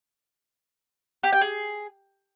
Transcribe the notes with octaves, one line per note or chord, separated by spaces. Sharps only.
G4
G5
G#4